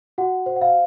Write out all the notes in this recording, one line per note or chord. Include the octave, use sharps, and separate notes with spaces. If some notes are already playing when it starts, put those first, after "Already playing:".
F#4 F#5
C5
F#5
F5